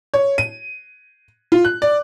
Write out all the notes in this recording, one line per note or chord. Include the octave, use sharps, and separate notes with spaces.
C#5
D#7
F4
F#6
D5